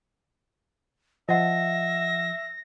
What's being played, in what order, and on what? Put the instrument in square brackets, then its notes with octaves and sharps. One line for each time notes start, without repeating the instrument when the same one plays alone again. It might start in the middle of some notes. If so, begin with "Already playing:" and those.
[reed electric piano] F3 [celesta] D#5 F#5 [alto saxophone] E5 [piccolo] A#6